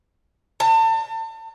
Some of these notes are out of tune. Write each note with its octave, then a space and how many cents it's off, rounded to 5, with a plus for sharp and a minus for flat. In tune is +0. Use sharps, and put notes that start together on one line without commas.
A5 +35